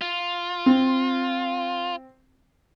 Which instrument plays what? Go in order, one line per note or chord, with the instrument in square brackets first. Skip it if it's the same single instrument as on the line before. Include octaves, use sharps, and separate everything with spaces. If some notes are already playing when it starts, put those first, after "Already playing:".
[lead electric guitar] F4
[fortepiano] C4